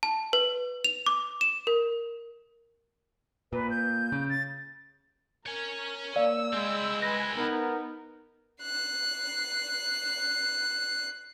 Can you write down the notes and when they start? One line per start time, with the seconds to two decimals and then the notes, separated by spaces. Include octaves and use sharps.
0.03 A5
0.33 B4
0.84 F7
1.06 D6
1.41 E7
1.67 A#4
3.53 A#2 B4
3.70 G6
4.12 C#3
4.29 A6
5.46 A#4 C#5 G#5
6.16 A#3 D5 F5 E6
6.53 G#3 C4 E4
7.02 B4 G#5 A#6
7.36 B3 D#4 A#4
8.62 F#6 C7